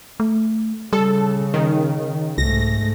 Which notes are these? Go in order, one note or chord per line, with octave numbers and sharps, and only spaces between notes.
A3
C#3 G3 A4
D#3
C2 G#2 A3 A#6